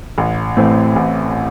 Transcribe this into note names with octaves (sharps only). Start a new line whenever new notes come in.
A1
A2 E3 A3 C4
A1